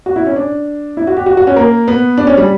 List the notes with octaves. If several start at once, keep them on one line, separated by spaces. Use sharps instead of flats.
F#4
E4
C#4
D4
E4
F#4
G4
F#4
F#4
C#4
A#3
B3
D4
C#4
G3